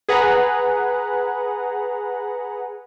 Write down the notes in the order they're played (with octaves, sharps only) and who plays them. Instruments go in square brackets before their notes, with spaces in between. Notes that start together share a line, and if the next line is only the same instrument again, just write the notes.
[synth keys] G#4 B4 F#5 A#5